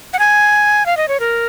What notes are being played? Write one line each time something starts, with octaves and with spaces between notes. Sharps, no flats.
F#5
G#5
F5
D#5
C#5
A#4